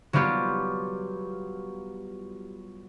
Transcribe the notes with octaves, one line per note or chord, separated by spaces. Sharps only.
F#3 G3 B3 F4 G4